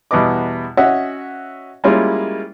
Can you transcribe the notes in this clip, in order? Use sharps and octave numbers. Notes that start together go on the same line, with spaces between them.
E2 B2 G3 B4 D#5 D6
C#4 F#4 D#5 E5 F#5
G3 G#3 A#3 C#4 E4 F4